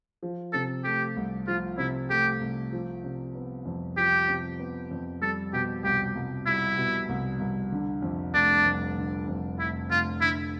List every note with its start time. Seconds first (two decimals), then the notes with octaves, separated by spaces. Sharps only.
0.23 F3
0.53 C3 A4
0.84 A3 G4
1.17 C2
1.47 F3 F4
1.78 C3 E4
2.10 A3 G4
2.41 C2
2.73 F3
3.04 C3
3.35 B3
3.65 F2
3.97 F3 G4
4.28 C3
4.59 B3
4.91 F2
5.21 G3 A4
5.53 B2 G4
5.84 C2 G4
6.15 C2
6.47 G3 E4
6.77 B2
7.09 C2
7.40 C2
7.72 D3
8.02 F2
8.34 F1 D4
8.65 F1
8.97 D3
9.27 F2
9.59 F1 E4
9.90 F1 F4
10.21 D3 E4